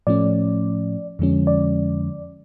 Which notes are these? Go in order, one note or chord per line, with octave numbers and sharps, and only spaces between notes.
A2 F3 A3 C#4 D5
F2 D3 F3 G#3 C#4
D5